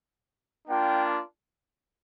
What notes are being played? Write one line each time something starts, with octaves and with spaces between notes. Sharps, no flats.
A#3 D4 F4 G5